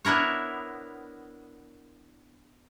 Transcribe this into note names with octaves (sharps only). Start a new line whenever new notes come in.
B3 D4 E4 A#4 C#5